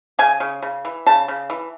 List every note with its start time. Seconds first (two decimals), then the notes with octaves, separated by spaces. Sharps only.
0.19 C#3 G#5
0.40 C#3
0.62 C#3
0.85 E3
1.06 C#3 A5
1.28 C#3
1.50 E3